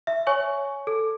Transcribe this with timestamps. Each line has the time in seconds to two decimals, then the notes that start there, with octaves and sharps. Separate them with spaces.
0.07 E5
0.27 C#5 G#5 C#6
0.87 A4